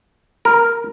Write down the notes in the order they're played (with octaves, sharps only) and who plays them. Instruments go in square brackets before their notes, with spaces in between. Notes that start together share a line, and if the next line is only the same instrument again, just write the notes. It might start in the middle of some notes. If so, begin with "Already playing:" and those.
[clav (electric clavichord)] A#4